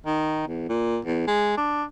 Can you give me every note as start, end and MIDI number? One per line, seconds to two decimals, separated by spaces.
0.06 0.44 51
0.47 0.65 40
0.69 0.98 46
1.05 1.26 40
1.27 1.53 56
1.57 1.83 62